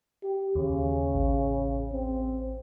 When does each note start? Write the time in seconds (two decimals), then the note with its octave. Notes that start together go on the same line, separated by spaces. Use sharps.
0.23 G4
0.55 D#2 C#3
1.14 A1
1.92 C4